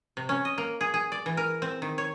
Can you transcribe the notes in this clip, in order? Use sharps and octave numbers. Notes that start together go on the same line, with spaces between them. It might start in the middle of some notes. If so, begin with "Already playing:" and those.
C3
C#4
D#5
A#3
G#4
G#4
D5
E3
A#4
C4
D#3
C#5